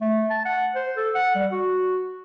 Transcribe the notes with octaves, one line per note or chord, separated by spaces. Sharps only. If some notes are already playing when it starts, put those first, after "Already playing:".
A3
A5
F#5
C5
A4
F#5
G3
F#4